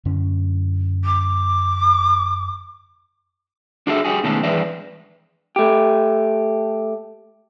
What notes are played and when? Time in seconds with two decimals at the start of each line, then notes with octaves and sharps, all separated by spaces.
0.05 F#2 D3 C#4
1.04 D6
3.87 D4 F#4 G#4 A4 C#5 E5
4.04 G3 F#4 G#4
4.24 B2 D#3 G#3 A3 C#4 A4
4.43 G2 E3 G#3 B4 D5 E5
5.56 A3 G4